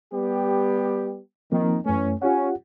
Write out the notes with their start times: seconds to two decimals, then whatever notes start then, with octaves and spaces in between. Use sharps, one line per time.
0.13 G3 B3 G4
1.52 D#3 F3 A#3 C4
1.86 F#2 E3 A3 C#4
2.22 C#4 F4 G4 F#5